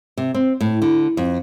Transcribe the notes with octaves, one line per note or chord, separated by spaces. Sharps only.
C3
C4
A2
D3
F2